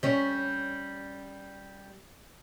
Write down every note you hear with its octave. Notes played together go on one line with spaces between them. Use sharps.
G3 C#4